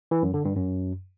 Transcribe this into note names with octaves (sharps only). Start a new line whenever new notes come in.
E3
F#2
D3
G2
F#2